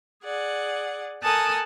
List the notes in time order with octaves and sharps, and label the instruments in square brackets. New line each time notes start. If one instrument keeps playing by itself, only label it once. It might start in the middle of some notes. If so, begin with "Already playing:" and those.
[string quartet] G#4 D5 F#5
A4 A#4 G#5 A5 D#6 F#6